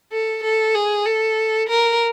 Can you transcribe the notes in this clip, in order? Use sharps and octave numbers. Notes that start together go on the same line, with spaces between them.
A4
A4
G#4
A4
A#4